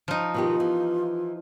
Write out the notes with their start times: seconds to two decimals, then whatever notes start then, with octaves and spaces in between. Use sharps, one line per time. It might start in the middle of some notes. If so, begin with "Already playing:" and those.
0.08 F3 D#4
0.34 B2 D#3 F4 G4
0.60 E3